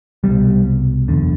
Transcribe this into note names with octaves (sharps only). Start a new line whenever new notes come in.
C2 B2 G3
F#1 E2 D3